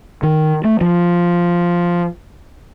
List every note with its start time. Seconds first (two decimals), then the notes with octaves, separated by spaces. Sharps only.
0.23 D#3
0.64 A3
0.81 F3